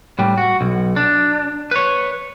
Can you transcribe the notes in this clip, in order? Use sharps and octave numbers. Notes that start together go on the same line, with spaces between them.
A2 G3
F#4
B1
D4
B4 C#5